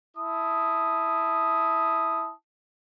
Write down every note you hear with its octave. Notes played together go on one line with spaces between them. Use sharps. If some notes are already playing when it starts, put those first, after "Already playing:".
E4 A5 D#6